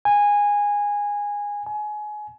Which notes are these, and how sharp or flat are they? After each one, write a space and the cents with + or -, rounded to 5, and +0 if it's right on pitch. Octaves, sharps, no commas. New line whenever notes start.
G#5 -15
G#5 +25